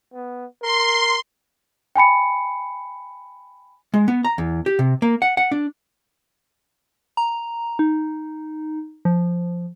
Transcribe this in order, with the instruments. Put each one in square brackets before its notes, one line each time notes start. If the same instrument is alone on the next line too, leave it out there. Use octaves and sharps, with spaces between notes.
[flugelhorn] B3
[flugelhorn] A#4 [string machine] C6
[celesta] G5 G#5 B5 C#7
[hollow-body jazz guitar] G#3
B3
A#5
E2
G4
C3
A#3
F#5
F#5
D4
[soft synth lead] A#5
D#4
F3